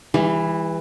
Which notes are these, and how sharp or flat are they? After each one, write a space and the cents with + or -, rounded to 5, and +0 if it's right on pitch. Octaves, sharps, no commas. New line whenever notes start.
E3 +0 G3 +45